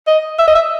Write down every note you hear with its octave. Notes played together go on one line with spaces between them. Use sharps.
D#5
E5
D#5
E5